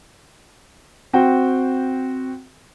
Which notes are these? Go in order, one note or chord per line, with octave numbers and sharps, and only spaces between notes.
C4 F#4 G5